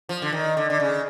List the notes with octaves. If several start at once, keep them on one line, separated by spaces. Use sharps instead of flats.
F3
D3
D#3
D3
D3
C#3